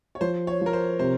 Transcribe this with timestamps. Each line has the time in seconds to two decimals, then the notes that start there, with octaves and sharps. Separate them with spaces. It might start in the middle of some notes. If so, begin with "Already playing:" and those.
0.15 C#5
0.21 F3 C5
0.47 C#5
0.61 F3 A#4
0.73 C5
0.99 C3 C5